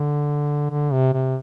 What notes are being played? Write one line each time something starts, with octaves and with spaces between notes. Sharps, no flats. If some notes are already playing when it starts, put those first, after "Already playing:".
Already playing: D3
D3
C3
C3